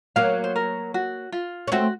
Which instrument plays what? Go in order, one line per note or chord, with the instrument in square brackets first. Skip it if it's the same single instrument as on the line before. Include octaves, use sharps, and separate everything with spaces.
[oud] F#3 A#3 [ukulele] F5
[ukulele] C5
A#4
F#4
F4
[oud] C#4
[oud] A3 C4 [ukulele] F#4